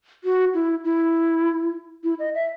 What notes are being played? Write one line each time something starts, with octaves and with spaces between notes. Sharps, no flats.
F#4
E4
E4
E4
D#5
E5